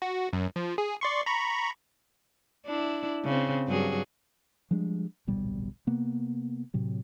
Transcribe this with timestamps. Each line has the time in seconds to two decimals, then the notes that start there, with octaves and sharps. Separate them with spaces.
0.02 F#4
0.33 F#2
0.56 F3
0.78 G#4
1.01 D5 C6 C#6
1.26 A#5 B5 C#6
2.67 D4 E4
3.25 C#3 C4
3.67 G2 F#3 G#4
4.71 F3 G3 G#3 D4
5.27 D1 A#1 B2 G3
5.87 C3 A#3 B3
6.74 A2 C3 F#3